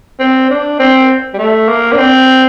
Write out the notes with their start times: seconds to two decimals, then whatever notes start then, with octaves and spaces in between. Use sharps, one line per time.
0.20 C4
0.50 D4
0.79 C4
1.34 G3
1.39 A3
1.69 A#3
1.93 D4
1.98 C4